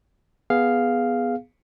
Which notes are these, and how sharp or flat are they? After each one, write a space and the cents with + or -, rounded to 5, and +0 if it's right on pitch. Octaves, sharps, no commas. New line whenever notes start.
B3 +0 G#4 +0 F5 +0